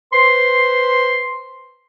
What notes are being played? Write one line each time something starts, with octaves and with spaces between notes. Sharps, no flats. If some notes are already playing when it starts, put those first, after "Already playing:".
B4 C5 C6